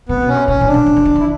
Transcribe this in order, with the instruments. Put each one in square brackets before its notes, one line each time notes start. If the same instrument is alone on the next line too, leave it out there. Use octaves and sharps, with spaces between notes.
[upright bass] C3 [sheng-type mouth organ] B3
[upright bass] B2
[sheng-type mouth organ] C#4
[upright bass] C3
[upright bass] B2 [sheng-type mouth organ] C#4
[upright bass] A#2
[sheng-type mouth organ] D4
[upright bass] B2
C3
C#3
D3
D#3
[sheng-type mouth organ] E4